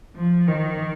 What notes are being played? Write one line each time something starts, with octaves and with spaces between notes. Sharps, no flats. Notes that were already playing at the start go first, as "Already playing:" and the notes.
F3
D#3